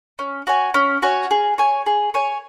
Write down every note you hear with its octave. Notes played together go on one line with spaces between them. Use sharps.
C#4
F#4 C#5 G#5
C#4
F#4 C#5 G#5
G#4
C#5 G#5
G#4
C#5 G#5